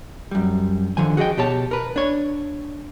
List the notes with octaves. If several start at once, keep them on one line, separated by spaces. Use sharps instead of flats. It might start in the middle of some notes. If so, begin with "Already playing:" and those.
F#2 G3
D3 D#3 F3 G#5
F#4 G#4 C5 D#5 G5
B2 G4 C#5 A5
A#4 B4
D4 C#5